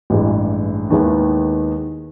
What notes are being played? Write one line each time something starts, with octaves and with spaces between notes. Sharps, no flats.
A1 G2 E3 G#3
D#2 D#3 G#3 B3 E4